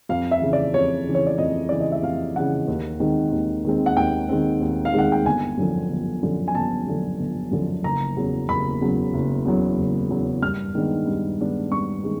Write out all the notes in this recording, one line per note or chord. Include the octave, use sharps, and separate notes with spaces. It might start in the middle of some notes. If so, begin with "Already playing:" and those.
F2 F5
E5
C#3 E3
D5
F2 C#5
C#3 E3
C#5
D5
F2 D#5
C#3 E3 D5
D#5
E5
F2 F5
C#3 E3 F#5
D#2
D#3 G#3 C4
D#2
D#3 G#3 C4
F#5
D#2 G5
D#3 G#3 C4
D#2
F5
D#3 G#3 C4 F#5
G5
G1 G#5
F#2 D3 F3
G1
F#2 D3 F3
G#5
G1 A5
F#2 D3 F3
G1
F#2 D3 F3
F#1 A#5
E2 C#3 F#3
F#1 B5
E2 C#3 F#3
F#1
E2 C#3 F#3
F#1
E2 C#3 F#3
G2 F6
D#3 G#3 B3 D4
G2
D#3 G#3 B3 D4
G2 C#6
D#3 G#3 B3